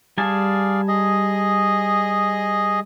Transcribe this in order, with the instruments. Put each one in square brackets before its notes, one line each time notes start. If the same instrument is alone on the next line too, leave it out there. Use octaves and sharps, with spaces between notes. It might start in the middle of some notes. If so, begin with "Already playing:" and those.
[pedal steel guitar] G3 G#5 A5 [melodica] G#4 D5 F5
[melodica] G#4 D#5